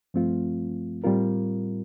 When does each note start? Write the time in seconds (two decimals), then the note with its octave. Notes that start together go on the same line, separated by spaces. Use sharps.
0.14 G2 F3 A3 C4 F4
1.04 A2 G3 C4 F4 A#4